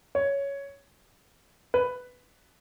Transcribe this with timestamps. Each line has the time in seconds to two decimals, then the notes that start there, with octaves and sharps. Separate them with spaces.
0.15 C#5
1.74 B4